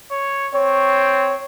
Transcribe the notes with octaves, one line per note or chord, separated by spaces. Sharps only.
C#5
C4 C#5